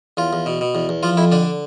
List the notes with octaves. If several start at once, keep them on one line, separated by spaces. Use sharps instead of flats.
E2 F4
E2
B2
B2
E2
E2
F3 F4
F2 E4
D3 D4